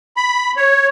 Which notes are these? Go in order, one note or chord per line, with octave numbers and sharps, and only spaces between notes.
B5
C#5